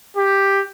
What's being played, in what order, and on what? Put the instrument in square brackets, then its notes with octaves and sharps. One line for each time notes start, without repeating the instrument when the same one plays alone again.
[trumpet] G4